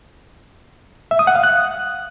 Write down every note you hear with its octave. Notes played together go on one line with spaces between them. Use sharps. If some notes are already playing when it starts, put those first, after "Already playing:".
E5
D#6
F#5
F5
F#6